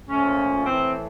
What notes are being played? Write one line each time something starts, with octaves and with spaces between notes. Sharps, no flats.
A#2 F3 A3 C#4
A2 E3 A3 C4